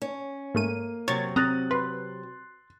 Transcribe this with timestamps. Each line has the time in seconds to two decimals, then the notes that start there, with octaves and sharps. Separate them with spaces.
0.02 C#4
0.55 G#2 A3 A#3 D#7
1.08 C3 F#3 C#5 G#6 A6
1.36 C4 A#5 D#6 F#6 A6
1.71 B4 C6